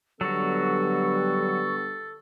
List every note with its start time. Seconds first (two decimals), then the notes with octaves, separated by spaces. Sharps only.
0.21 D3 F#3 G3 B3 F#4 A4 C#6